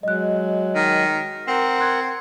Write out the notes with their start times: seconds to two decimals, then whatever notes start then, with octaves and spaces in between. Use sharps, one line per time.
0.03 F#3 G#3 D#5 F#6
0.75 D#3
1.48 C4 A#4 F#5
1.79 C6 F#6 G#6